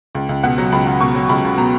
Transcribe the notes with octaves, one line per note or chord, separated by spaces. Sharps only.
C#2
C#2
B2 F#5
F#3
C#2 B5
C#2
B2 C#6
F#3
C#2 B5
C#2
B2 A#5